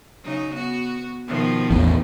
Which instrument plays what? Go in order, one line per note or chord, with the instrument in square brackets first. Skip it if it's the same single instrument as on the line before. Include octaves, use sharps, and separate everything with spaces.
[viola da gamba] C#3 F#3 D#4
B3 F#4
B2 D#3 F3
[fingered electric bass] A1 E2